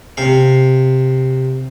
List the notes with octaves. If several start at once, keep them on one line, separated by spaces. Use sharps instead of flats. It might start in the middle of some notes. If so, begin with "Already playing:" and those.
C3 F5